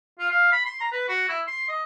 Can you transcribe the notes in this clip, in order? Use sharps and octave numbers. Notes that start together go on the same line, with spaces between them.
F4
F5
B5
C6
A#5
B4
F#4
E4
C6
D#5